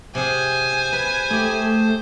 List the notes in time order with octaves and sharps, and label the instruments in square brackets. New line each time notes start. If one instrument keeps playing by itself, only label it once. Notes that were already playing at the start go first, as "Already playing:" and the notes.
[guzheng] C3 G#4 [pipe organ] C5 [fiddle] G#5
[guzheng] B4
[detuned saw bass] A3 [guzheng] G4 G#4